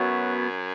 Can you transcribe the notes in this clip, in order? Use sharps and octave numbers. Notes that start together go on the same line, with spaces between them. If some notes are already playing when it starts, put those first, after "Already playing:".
Already playing: F#2 B3 F#4 C#5 E5